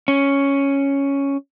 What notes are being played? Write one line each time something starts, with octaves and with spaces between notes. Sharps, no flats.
C#4